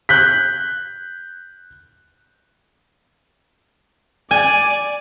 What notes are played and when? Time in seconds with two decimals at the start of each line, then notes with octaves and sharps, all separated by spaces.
0.09 F#6 G6 B6
4.31 D5 G#5